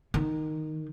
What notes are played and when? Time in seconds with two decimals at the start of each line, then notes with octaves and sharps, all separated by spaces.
0.14 D#3